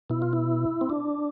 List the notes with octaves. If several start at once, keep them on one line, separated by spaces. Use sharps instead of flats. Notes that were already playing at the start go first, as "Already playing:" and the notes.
B2 E4
F4
E4
C4
D4